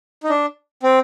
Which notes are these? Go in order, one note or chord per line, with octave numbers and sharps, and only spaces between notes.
D#4
D4
C4